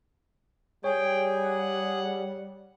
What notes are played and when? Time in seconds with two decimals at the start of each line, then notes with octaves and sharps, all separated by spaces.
0.84 G3 G#4 C#5 G5
1.42 F#5